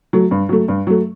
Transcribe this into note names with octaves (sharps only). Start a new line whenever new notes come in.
F#3 A3
G2
F#3 A3
G2
F#3 A3